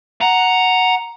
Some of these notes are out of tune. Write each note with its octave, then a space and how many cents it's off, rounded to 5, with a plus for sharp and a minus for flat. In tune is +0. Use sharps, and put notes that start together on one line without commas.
F#5 +0 A#5 +0